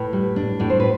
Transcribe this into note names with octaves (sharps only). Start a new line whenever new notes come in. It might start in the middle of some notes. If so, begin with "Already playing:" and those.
Already playing: A2 B4
G3
D4
A2 D5
C5
B4